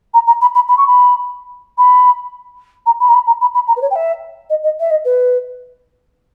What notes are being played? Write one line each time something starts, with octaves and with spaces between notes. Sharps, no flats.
A#5
A#5
B5
B5
B5
C#6
B5
B5
A#5
B5
A#5
B5
A#5
B5
B5
A#5
B4
C#5
G5
E5
D#5
D#5
E5
D#5
B4